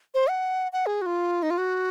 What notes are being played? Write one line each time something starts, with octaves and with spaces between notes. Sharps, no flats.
C5
F#5
F#5
G#4
F#4
F4
D#4
F4
F#4